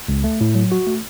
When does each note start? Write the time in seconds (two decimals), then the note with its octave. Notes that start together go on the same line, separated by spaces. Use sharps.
0.08 C#2
0.24 A3
0.41 A2
0.55 F#3
0.72 F#4
0.87 A3